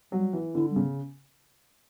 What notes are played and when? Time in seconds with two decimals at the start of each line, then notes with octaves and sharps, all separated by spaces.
0.12 F#3 G3
0.33 E3
0.55 D3 E4
0.71 G3
0.76 C#3